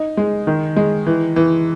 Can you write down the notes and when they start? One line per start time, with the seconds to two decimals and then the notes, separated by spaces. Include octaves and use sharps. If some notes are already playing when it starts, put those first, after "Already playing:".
Already playing: D#4
0.17 G#3
0.47 D#3
0.76 G#3
1.06 E3
1.36 E3